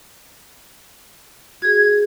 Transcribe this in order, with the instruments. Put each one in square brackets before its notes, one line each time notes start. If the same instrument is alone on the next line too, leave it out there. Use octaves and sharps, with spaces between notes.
[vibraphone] F#4 G#4 [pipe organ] G#6